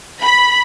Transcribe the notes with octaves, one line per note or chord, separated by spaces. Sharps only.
B5